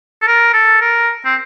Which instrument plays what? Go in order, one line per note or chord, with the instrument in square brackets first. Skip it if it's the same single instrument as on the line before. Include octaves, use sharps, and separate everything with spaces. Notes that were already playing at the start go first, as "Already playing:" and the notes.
[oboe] A4
A#4
A4
A#4
C4